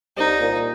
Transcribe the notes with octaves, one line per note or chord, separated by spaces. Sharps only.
C2 D#4
A#2